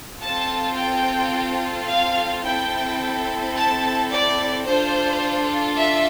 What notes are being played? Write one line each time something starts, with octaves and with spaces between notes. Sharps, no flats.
C4 F4 A4 A5
G5
F5
C4 E4 A4 G5
A5
D5
D4 F4 A4 C5
E5